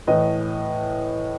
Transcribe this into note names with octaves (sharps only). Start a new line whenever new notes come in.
A2 E3 B4 D#5